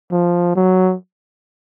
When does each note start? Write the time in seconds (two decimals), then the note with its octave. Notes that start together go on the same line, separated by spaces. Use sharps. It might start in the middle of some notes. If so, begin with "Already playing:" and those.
0.11 F3
0.55 F#3